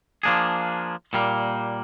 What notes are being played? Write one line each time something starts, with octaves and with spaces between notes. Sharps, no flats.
F3 A#3 D4 G#4
A#2 G3 A#3